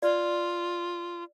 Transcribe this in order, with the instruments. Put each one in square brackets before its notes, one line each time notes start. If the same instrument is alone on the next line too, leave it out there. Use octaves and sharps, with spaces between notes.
[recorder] F4 [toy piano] D5